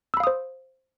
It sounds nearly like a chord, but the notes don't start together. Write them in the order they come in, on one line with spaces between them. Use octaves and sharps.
E6 B5 F5 D#6 C5